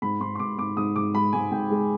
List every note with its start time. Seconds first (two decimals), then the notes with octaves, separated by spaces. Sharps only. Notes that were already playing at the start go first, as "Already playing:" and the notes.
0.02 G#2 B5
0.20 G#2 C6
0.35 C6
0.39 G#2 D6
0.58 G#2 D6
0.77 G#2 D#6
0.96 G#2 D6
1.14 G#3 B5
1.33 G#2 G#5
1.51 G#2 G5
1.70 G#3